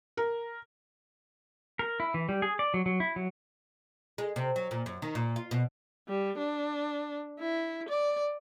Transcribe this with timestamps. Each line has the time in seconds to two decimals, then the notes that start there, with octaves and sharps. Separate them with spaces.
0.17 A#4
1.79 A#4
2.00 E4
2.14 E3
2.29 G3
2.42 G#4
2.59 D5
2.74 F#3
2.86 F#3
3.00 E4
3.16 F#3
4.18 G#3
4.36 C3
4.56 F#3
4.71 A#2
4.86 F#2
5.02 D#3
5.15 A#2
5.36 F4
5.51 B2
6.09 G3
6.38 D4
7.40 E4
7.89 D5